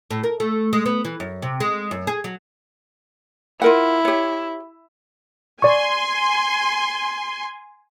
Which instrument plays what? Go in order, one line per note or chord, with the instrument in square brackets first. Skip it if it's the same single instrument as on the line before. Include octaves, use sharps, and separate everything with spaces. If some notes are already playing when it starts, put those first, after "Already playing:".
[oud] A2
A#4
A3
G#3
B3
E3
F#2
C3
G#3
F#2
G#4
F#3
[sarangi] E4 [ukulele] F4 A#4 F#5
[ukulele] G4 C#5
[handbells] D5 C#6 [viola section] G#5 C6